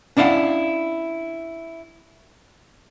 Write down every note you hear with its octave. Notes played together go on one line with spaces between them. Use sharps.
C#4 D4 E4 F5 F#5